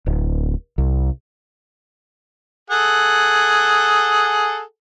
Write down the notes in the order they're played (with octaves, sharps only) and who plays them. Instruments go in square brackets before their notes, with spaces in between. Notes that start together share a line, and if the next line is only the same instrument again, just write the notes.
[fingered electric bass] D1
C2
[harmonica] G#4 A4 F#5